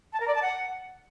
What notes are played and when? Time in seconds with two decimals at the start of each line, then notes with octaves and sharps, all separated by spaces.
0.13 A5
0.20 A#4
0.28 D5
0.35 A5
0.42 F#5